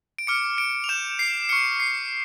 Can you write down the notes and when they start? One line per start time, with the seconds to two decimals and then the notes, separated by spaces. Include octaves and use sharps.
0.19 D7
0.27 D6 F6 C#7
0.58 D7
0.84 F7
0.89 D6 G6 E7
1.19 C7
1.49 C#6 F6 C#7
1.80 C7